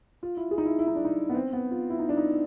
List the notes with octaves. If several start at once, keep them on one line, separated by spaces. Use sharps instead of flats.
F4
E4
G#4
D#4
E4
E4
D#4
D4
D#4
B3
C4
B3
F4
E4
D#4
D4
D#4